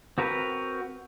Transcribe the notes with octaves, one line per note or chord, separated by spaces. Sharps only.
C4 F#4 A#4 B4